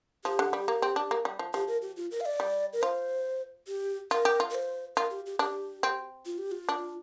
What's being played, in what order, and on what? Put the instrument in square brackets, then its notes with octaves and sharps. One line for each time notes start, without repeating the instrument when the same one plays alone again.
[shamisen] F3 [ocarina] G4
[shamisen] D3
G3
A#3
C4
D4
A#3
G3
F3
[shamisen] F3 [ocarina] G4
[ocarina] A#4
G4
F4
A#4
F5
D5
[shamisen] G3
[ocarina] A#4
[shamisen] F4 [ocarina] C5
[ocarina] G4
[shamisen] F4 [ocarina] A#4
[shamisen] G4
F4
[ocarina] A#4
C5
[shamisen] F4 [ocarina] A#4
[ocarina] G4
G4
[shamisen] D4 [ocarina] G4
[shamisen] C4
[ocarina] F4
G4
F4
[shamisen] D4